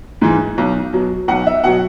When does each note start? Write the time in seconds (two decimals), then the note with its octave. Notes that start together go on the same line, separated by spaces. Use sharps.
0.22 G#2 E3
0.58 B1
0.93 B2 F#3
1.28 B1 F#5
1.47 E5
1.64 B2 F#3 F#5